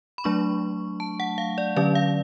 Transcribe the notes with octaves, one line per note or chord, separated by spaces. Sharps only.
B5
F#3 A3 D4 C#6
A5
F#5
F5
D5
D3 F#3 C#4 D5
F5